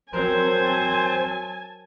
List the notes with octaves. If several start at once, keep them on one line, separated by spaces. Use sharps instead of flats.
F#3 C4 A#4 C5 G#5 A5